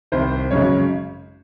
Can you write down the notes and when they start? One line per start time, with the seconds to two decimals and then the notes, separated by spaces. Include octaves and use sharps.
0.12 C2 C3 D#3 C5
0.51 G#1 F#2 C#3 G#3 C#5